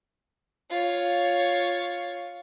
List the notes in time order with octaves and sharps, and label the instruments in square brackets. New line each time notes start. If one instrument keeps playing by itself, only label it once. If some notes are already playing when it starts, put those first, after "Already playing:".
[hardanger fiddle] F4 C#5